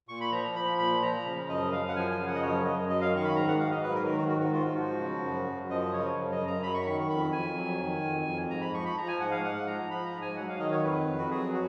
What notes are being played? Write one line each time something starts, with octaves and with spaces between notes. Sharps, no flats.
A#2 C#6
B5
F3 A#5
F3 B5
A#2 B5
F3 A#5
C#3
F#2 D#5
F#2 F5
F#5
F3 G#5
G#5
C#3
F#5
D#5
F#2 C#5
F#2 D#5
F#3 D#5
F5
D#3 C#6
B5
G#2 A#5
F#5
G#2 F5
D#5
F#3 B4
A#4
D#3 A#4
F#4
G#2 F#4
F#4
G#2 F4
F#4
F3
C#3
F#2
F#2
F3 D#5
C#3 C#5
F#2
D#5
F#2
A#5
F#3 B5
C#6
B5
D#3 C#6
F2 B5
F2 G#5
F#3
D#3
F2
F2
G#2 A#5
B5
F3 C#6
B5
F3 A#5
G#5
G#2 F#5
F5
G#2 F#5
F3 A#5
F3 B5
A#5
G#2
G#5
F#3 F#5
F5
D#3 D#5
C#5
F2 B4
F2
F#4
F#3 G#4
F#4